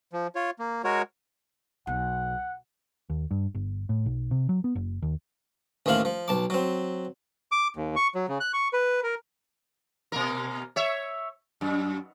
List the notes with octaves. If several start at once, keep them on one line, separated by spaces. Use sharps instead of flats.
F3
F4 C#5
A#3
G#3 F#4 A#4 C#5
B1 F#5
D#2
G2
G1
A2
B1
C3
F#3
B3
F#1
D#2
A1 D#2 F3 E4 F5 B5
F3
B1 A5 D6
F#3 C4
D6
D#2
C#6
F#3
C#3
F#6
C#6
B4
A#4
B2 A#3 A#4
C#5 E5
F#2